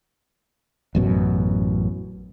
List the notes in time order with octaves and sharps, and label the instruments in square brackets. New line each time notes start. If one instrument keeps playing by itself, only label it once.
[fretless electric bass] A1 F#2 B2